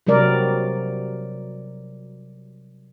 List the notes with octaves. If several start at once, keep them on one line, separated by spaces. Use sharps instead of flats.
C3 F#3 G3 A#4 D5